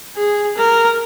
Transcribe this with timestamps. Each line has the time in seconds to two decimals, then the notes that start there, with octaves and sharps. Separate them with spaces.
0.16 G#4
0.57 A#4